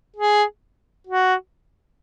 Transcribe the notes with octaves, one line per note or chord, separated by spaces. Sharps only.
G#4
F#4